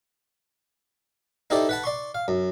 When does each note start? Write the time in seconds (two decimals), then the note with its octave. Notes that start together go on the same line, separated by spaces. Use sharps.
1.50 D#4 E4 G4 A4 C5 D5
1.69 B4 F#5 A5
1.84 D5 C6 C#6
2.15 F5
2.28 F#2